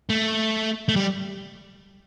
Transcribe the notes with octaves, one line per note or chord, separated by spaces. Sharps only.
A3
A3
G3